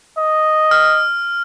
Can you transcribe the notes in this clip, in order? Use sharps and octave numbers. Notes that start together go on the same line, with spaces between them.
D#5
F6